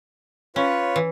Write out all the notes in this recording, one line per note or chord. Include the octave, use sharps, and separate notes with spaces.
C#4 F4 B4 C#5
E3